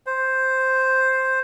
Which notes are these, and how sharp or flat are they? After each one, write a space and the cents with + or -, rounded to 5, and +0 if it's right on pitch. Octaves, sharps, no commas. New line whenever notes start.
C5 +5